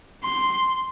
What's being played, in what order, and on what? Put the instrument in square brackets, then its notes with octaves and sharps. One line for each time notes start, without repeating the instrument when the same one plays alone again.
[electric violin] C6